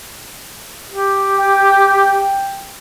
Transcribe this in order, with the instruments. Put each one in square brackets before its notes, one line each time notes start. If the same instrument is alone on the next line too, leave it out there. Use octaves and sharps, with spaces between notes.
[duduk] G4
[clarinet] G5